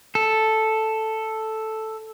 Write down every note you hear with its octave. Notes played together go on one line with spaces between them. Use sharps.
A4